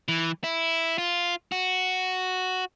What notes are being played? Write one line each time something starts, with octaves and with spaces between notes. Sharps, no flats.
E3
E4
F4
F#4